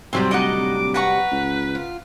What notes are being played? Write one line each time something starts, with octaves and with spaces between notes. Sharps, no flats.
C3 F#3 G3 C4 F4 G4
D1 D#4 D#5 F#5 D6
B4 F#5 A#5 C#6
C#2
F4